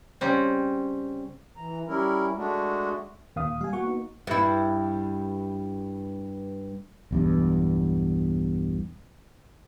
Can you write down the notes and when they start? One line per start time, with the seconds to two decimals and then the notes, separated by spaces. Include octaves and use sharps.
0.21 C#3 G3 C4
1.57 E3 A#5
1.88 G3 C#4 E4 A#4
2.36 G#3 A3 D4 F#4
3.36 D#2 A#2 A#3 F5 D#6
3.61 G3 F5 G#5
3.73 A#3 F#4 F#5 C#6
3.85 A#3 B3 D#4
4.27 G2 E4
7.11 B1 E2 G2